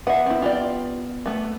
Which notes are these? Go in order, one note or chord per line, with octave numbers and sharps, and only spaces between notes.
B3 E5 F#5
C4 E4
F4 G4 D5
A3 B3